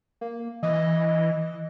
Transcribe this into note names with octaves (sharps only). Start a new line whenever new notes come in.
A#3
E3 D#5